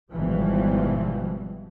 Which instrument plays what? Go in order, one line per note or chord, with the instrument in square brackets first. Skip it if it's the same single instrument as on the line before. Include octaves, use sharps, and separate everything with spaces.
[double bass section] G#1 B2 E3 F3 G3